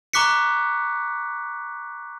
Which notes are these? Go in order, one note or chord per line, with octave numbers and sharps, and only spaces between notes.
A#5 C#6 D6 F#6 B6 C#7